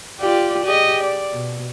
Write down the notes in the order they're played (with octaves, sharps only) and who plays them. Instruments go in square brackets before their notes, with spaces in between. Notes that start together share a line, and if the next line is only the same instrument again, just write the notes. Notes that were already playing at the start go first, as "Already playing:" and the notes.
[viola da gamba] F4 G4 D5
G4 G#4 D#5
D5
B2